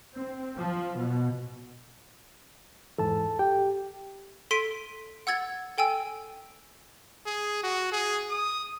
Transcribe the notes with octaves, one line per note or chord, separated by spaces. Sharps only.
C4
F3
B2
E2 G#2 E3 A4 A5
G4 G5
A4 C6 B6 D7 D#7
F#5 E6 G#6 A6
A4 G5 G#5 E6
G#4
F#4
G#4
D#6